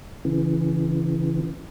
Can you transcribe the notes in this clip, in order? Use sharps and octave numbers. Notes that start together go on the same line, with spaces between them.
C#3 E3